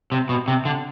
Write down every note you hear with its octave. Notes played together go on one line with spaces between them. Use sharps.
C3
B2
C3
D3